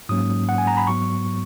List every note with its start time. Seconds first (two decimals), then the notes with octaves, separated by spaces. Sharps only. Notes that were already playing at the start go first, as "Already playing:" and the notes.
0.09 G#2 F#3 A#3 C#4 D#6
0.49 F#5
0.58 G#5
0.67 A#5
0.77 B5
0.86 G#2 F#3 B3 C#6